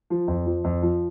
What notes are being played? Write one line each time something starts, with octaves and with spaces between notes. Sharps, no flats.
F3
F2
F3
F2
F3